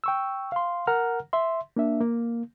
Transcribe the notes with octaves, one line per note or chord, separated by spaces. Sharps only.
G5 C#6 E6
F5 C6
A#4 F#5 A#5 F6
E5 C6
A#3 D4 E5
A#3